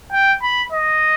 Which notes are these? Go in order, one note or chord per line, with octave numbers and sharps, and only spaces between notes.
G5
B5
D#5